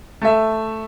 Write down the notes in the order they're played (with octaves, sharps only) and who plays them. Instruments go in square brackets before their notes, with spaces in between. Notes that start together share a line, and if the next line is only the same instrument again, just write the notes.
[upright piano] A3 E5